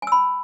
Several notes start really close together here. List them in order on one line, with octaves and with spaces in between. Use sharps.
G#5 E6 B5